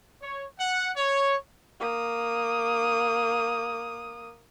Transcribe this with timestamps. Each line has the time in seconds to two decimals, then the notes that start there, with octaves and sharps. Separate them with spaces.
0.22 C#5
0.59 F#5
0.97 C#5
1.80 A#3 D#6